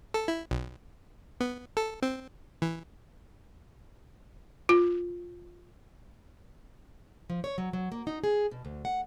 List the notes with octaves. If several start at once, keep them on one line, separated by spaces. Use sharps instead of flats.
A4
E4
B1
B3
A4
C4
E3
F4
F3
C#5
F#3
F#3
A#3
D#4
G#4
B2
D2
F#5